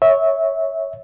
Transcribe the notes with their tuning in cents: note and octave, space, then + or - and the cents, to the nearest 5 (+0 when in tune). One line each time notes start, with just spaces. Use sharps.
C#5 +0 E5 -20